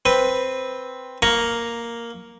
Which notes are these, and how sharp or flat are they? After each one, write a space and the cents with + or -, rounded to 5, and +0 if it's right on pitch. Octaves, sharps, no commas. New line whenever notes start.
C4 +0 B4 +0
A#3 +0 A#5 +0 C#6 +10